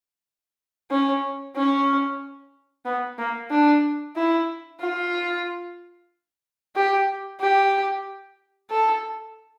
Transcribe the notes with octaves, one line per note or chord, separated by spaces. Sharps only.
C#4
C#4
B3
A#3
D4
E4
F4
G4
G4
A4